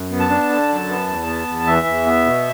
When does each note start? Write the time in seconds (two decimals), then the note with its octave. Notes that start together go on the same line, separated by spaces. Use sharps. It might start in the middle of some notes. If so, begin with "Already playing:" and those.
Already playing: F#2
0.10 B3
0.20 A5
0.30 D4
0.50 D3
0.69 F#2
0.89 B3
1.08 E2
1.27 B3
1.48 E2
1.67 E3 E5
1.86 E2
2.06 B3
2.26 B2